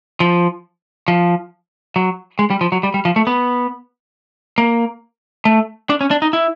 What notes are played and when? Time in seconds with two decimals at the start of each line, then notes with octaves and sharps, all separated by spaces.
0.20 F3
1.08 F3
1.96 F#3
2.39 G#3
2.50 G3
2.61 F3
2.72 F#3
2.83 G3
2.94 G3
3.05 F3
3.16 A3
3.27 B3
4.58 A#3
5.45 A3
5.90 D4
6.01 C#4
6.11 D4
6.22 D#4
6.33 E4